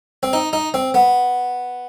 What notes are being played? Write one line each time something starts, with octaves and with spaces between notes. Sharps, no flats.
C4
D#4
D#4
C4
B3